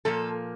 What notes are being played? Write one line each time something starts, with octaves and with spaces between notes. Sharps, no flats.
A#2 F3 A#3 A4